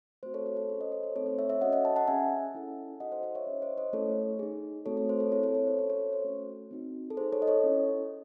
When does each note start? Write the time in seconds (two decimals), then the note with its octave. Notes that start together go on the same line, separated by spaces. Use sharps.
0.23 A3 C4 F#4 C5
0.34 A4 C#5
0.46 C5
0.57 A4
0.69 C#4 G#4 C5
0.81 C5 D#5
0.92 A4 C#5
1.03 C5
1.16 A3 C4 D#4 A4 C#5
1.26 C5
1.39 C#5 E5
1.49 C#5 E5
1.61 C#4 F#4 A4 D#5 F#5
1.73 D#5 F#5
1.85 F#5 A5
1.96 F#5 A5
2.08 C#4 G#4 E5 G#5
2.54 C#4 E4 A4
3.00 D#4 F#4 A4 D#5 F#5
3.12 C5 D#5
3.23 C5 D#5
3.35 C#5 E5
3.46 C#4 E4 G#4
3.62 C5 D#5
3.78 C5 D#5
3.93 A3 C#4 E4 A4 C#5
4.39 D#4 G#4
4.86 A3 C4 F#4 A4 C#5
4.97 A4
5.09 C5
5.20 A4 C#5
5.32 C4 E4 G#4 A4 C#5
5.43 A4 C#5
5.55 A4
5.67 C5
5.78 C#4 F#4 A4 C#5
5.90 A4 C#5
6.02 C5
6.13 C5
6.24 A3 C#4 F#4 A4
6.71 C4 D#4 F#4
7.10 A4
7.17 D#4 G#4 C5
7.33 A4 C#5
7.42 D#5
7.47 A4 C#5
7.64 C#4 E4 A4